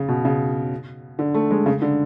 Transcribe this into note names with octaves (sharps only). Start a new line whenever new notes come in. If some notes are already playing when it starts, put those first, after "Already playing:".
Already playing: C#3
B2
C#3
D3
A3
G#3
C#3
D3